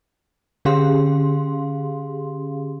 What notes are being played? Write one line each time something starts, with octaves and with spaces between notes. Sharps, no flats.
D3 C#4 G4 G#4 F5 C6